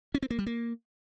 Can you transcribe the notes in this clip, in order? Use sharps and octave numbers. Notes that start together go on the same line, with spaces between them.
C#4
C4
A#3
G3
A#3